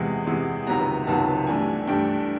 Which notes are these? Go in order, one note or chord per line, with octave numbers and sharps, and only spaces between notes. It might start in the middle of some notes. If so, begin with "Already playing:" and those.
Already playing: E2 C3 E3 G#3 F#5
E2 C3 E3 G#3
C#2 C3 D#3 F#3 B3 A#5
C#2 C3 D#3 F#3 B3 A5
G2 E3 A3 D4 G#5
G#5
G2 E3 A3 D4 G5